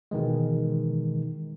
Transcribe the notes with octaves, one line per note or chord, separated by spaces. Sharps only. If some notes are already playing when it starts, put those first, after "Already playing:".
B2 D#3 E3 G#3